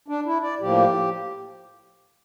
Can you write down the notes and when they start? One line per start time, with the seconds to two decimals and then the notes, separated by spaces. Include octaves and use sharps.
0.08 D4
0.26 E4
0.42 D5
0.61 A2 F3 A#3 G4